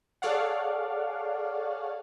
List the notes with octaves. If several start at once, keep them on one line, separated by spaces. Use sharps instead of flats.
G#4 A4 C#5 D5 F5 F#5